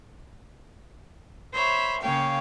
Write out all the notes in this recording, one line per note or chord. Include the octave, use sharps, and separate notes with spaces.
C5 C#5 E5 B5
C#3 A#3 C#5 F5 G5